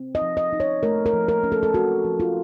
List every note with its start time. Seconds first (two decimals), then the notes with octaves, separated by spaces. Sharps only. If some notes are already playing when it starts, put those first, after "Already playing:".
Already playing: C4
0.15 D#5
0.22 F3
0.37 D#5
0.53 D#4
0.60 C#5
0.83 A3 A#4
1.06 A#4
1.13 F3
1.28 A#4
1.44 C#4
1.52 A4
1.63 A4
1.74 C4 F#4
2.04 F3
2.20 F4